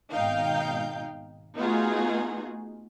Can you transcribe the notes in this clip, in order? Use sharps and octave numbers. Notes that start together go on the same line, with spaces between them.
G#1 B2 D#4 F5 G5 G6
A3 B3 D#4 F4 F#4 G#4